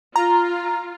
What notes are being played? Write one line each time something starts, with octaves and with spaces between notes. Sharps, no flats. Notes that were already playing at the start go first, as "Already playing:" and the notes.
F4 A#5